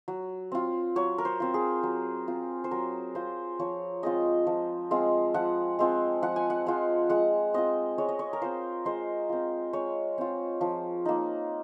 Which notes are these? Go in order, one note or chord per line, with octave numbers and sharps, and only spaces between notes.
F#3
C4 F4
F#3 C#5
A#4
C5
C4 F4
G#4
F#3
C4 F4
C5
F#3 A#4
C4 F4 C5
F3 C#5
G#3 C4 F4 D#5
F3
G#3 C4 F4
F3 F#5
G#3 C4 F4
F3 F#5
G#5
F#5
G#3 C4 F4
G#3 F#5
C4 F4 D#5
G#3 C#5
D#5
C#5
A#4
C4 F4 C5
G#3 C5
C4 F4
G#3 C#5
C4 F4
F3
A#3 D#4